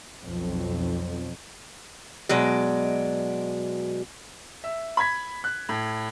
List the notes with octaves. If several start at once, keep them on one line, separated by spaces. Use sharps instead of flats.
B1 F2
B2 F#3 G#3 D5
E5
B5 G#6 B6
F#6
A2